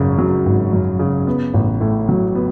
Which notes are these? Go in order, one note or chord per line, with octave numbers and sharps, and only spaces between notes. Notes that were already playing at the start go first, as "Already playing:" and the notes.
Already playing: G#1 F#2 C#3
F#3
G#1
F#2
C#3
B3
A1
A2
F#3
B3